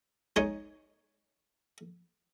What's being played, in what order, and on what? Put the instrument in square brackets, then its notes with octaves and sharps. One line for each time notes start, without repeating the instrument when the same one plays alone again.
[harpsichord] G#3 D#4 C#5